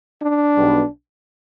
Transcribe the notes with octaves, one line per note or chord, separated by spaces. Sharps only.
D4
B1 B2 G3 B3